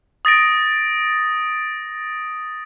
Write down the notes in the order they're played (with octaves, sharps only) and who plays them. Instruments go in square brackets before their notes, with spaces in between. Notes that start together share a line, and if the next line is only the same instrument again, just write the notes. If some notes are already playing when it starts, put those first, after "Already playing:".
[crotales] D#6 A6 A#6 D7